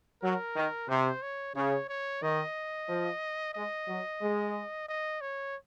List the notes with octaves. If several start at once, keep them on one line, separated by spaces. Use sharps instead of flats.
F#3 A#4
D#3
C3 C5
C#5
C#3 C#5
C#5
D#3 D#5
F3
G#3 D#5
F#3
G#3
D#5
C#5